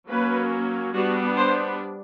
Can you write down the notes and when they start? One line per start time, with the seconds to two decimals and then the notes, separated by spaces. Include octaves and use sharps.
0.09 F#3 A#3 C#4 B4
0.94 G3 B3 D4 F#4
1.37 C5